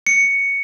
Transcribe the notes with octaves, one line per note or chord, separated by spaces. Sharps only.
C#7